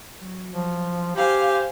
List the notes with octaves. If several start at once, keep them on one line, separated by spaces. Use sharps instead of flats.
F#3
F3
G4 C5 F5 G#5